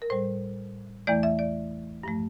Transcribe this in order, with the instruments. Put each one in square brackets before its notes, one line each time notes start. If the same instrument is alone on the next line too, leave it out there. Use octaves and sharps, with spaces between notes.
[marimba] A#4
A2 G3 C5
E2 E3 A3 D5
E5
D5
G2 F3 A3